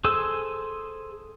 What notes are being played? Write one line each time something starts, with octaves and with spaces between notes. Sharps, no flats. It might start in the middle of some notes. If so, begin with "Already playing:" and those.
G#4 A4 C5 G#5 E6